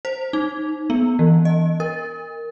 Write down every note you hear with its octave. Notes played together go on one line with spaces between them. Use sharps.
C5
D#4
B3
E3
D#5
A#4